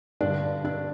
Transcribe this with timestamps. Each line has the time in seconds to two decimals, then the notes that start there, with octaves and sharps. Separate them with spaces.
0.21 G2 D3 D4 D5
0.65 D4 D5